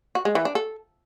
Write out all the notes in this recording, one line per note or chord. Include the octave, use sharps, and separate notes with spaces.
F#4
G#3
E3
D4
A4